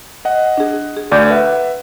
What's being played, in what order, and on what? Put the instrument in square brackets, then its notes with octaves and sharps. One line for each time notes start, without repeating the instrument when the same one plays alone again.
[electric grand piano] D#5 F#5
[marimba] D4 G#4
G#4
[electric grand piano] D2 [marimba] D5 D6 G6
[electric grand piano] B4 E5 F#5